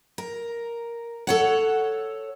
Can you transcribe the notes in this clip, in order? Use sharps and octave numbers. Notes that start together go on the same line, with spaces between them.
A#4
A4 C#5 F#5